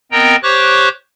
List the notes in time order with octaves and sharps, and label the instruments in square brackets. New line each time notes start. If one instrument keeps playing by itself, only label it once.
[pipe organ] B3 C4 A#4 D#5 G5 A#5
G4 C5 C#5 C#6 D6 F#6